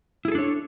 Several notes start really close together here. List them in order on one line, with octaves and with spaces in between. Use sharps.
E4 G#4 A4 D4 C#5